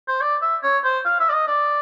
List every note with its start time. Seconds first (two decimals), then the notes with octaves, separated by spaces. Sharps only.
0.08 C5
0.21 D5
0.42 E5
0.63 C#5
0.84 C5
1.05 F5
1.20 E5
1.29 D5
1.33 D#5
1.47 D5